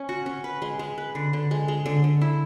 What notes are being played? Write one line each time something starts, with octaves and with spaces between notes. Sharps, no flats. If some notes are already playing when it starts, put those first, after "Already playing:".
Already playing: C#4
F#4
C#4
B4
G#3
G#3
B4
D3
D3
G#3
G#3
D3
D3
E4